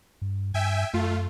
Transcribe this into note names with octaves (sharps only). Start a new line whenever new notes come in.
G2
G2 E5 G5 G#5
F#2 A3 F4